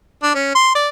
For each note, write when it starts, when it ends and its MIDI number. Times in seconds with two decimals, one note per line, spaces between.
0.23 0.33 62
0.34 0.53 61
0.55 0.74 84
0.75 0.88 74